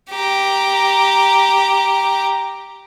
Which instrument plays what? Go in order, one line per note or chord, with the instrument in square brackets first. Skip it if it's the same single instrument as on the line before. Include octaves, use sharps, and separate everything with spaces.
[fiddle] G4 A#5